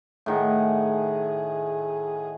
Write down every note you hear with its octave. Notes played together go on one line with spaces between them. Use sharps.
A2 D#3 G#4 F#5